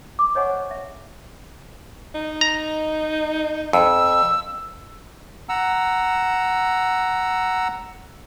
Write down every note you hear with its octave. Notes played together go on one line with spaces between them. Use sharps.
D6
C5 C#5 D#5 F#5 G#5 C#6
C5
E5
D#4
A#5
F2 E6
F#5 A#5 E6